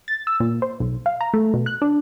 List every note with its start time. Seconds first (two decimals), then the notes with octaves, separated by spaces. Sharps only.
0.08 A6
0.27 E6
0.40 A#2
0.62 C5
0.80 B1
1.06 F5
1.21 A#5
1.34 A3
1.54 B2
1.66 F#6
1.82 D4